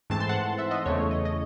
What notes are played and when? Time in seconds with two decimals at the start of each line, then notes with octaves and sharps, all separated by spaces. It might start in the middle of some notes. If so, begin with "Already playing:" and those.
0.10 G#2 E3 A3 C4 A5
0.20 C6
0.29 F#5 A5
0.58 E5
0.71 D#5
0.86 E2 C#3 E3 A3 C#5
1.11 D#5
1.25 D#5